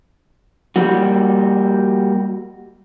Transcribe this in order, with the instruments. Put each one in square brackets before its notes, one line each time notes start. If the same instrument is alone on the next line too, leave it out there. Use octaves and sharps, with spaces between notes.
[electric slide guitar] G3 A#3 F#4